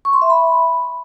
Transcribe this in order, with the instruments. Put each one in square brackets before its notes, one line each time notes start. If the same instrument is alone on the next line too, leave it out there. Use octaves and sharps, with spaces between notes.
[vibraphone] C#6
C6
E5
B5